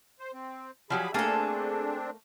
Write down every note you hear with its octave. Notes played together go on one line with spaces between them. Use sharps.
C5
C4
F3 F#3 G4 G#4 B5
A3 A#3 C4 D4 G#4 A4